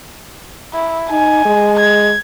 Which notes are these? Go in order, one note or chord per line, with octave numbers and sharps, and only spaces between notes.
E4
D#4 G#5
G#3
G#6